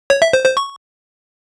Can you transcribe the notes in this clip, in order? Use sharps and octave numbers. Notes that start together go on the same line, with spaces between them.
C#5
E5
C5
C5
C#6